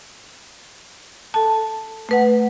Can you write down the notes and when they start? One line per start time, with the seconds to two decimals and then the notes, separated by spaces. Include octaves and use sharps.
1.34 A4 A5
2.09 A3 B4 F#5